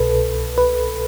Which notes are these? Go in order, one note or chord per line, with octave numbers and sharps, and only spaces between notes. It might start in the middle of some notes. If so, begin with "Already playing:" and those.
Already playing: C2 B2 A4 B4
B4